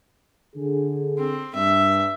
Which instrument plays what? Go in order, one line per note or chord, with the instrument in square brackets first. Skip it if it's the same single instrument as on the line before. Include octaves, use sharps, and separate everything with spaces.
[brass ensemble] D3 G#4
[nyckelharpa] C4
[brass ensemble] G2 [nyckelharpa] E5